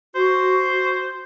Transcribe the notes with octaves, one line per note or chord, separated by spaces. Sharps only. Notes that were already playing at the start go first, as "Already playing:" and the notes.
F#4 C5